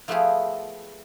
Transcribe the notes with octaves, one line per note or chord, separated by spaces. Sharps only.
F3 A3 B3 E4 G4 G#4